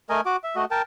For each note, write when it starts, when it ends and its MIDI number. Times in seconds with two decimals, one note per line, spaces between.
0.10 0.21 57
0.10 0.21 70
0.10 0.21 75
0.10 0.21 80
0.26 0.37 66
0.26 0.37 86
0.44 0.56 76
0.56 0.65 57
0.56 0.65 66
0.56 0.65 75
0.71 0.82 70
0.71 0.82 79
0.71 0.82 81